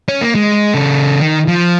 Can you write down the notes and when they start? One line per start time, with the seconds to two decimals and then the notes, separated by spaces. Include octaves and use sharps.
0.08 C#4
0.21 A#3
0.35 G#3
0.74 C#3 A4
1.20 D#3
1.48 F3